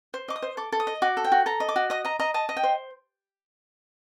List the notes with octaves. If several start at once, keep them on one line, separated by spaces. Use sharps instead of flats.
C5
D#5 D6
D#6
C5
A4 D6
A4
D#6
D#5
F#4 D6
A4
G5
F#4
A4 A#5
D#5
D6
F#4
D#5 D#6
D#5 A#5
D#5 A#5
D#5 A5
D#5
G5
C5